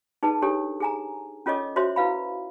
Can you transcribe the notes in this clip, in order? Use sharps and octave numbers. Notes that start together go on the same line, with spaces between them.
D#4 G#4 B4 A5
D4 G4 A4 C#5
G#4 G#5 A#5
C#4 F4 A4 C#5 D#5 D6
F#4 C5 C#5 E5 C6
E4 B4 F5 B5